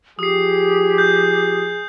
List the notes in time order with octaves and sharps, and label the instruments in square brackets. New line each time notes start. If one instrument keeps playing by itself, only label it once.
[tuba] F3 [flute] G4 [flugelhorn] G#4 [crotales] D#6 C7
[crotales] G6